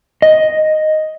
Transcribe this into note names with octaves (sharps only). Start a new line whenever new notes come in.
D#5